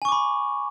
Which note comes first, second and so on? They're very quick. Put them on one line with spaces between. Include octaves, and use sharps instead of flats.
G#5 C#6 D6 B5